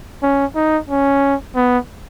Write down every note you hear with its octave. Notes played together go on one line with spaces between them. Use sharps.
C#4
D#4
C#4
B3